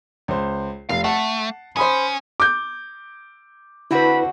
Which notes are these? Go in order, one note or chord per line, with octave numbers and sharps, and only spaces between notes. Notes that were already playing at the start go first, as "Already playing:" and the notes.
C#2 C5
F1 F5 C7
A3 F#5 A5
C#4 C5 B5 D#6
D6 G6
D3 C4 E4 F#4 B4 B5